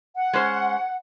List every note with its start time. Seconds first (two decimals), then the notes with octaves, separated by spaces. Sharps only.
0.16 F#5
0.33 G#3 C#4 C5